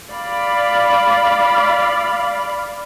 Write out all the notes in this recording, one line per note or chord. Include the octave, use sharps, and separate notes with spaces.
D5 F5 B5